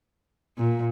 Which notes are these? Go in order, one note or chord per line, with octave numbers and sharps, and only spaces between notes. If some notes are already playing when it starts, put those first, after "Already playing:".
A#2